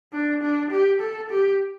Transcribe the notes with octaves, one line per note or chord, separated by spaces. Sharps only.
D4
D4
G4
A4
G4